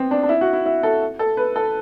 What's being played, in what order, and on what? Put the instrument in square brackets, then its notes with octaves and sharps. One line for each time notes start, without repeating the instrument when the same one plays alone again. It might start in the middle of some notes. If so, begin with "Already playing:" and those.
Already playing: [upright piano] B3 C4
D4
D4
E4
F#4
E4
E4
A4
A4
B4
A4